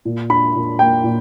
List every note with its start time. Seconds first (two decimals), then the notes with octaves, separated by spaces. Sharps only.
0.05 A#2
0.30 D4 B5
0.55 A#2
0.79 A#3 G5
1.04 A#2